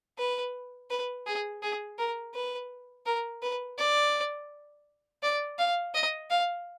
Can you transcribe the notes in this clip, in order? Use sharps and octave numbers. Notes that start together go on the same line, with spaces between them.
B4
B4
G#4
G#4
A#4
B4
A#4
B4
D5
D5
F5
D#5
F5